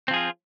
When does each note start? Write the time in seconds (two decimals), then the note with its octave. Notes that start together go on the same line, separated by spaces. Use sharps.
0.08 C4
0.11 F3
0.14 G#4
0.16 F4